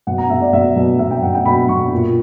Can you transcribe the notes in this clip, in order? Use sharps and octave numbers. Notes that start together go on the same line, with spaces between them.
B2 F#5
A#5
B2 E5
D5
B2 E5
B2
B2 E5
G5
B2 F#5
G5
B2 B5
B2 C#6
A#2